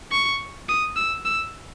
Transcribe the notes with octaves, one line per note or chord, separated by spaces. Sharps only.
C#6
D#6
E6
E6